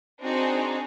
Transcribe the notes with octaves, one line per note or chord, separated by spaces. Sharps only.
C4 D4 D#4 F#4 G#4 C5